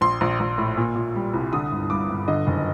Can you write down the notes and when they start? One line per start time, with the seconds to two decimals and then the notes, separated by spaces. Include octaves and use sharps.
0.01 A#1 C6
0.21 A#1
0.40 A#1
0.58 A2
0.77 A#2
0.95 A#2
1.16 G3
1.34 C2
1.53 D3 D#6
1.72 G1
1.90 G2 D6
2.10 G1
2.28 D3 D#5
2.47 F#1